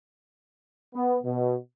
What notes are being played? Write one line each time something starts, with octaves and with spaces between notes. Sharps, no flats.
B3
B2